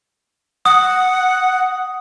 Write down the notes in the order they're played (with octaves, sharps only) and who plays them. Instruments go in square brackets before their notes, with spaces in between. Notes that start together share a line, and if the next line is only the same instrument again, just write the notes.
[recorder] F#5 [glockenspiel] D#6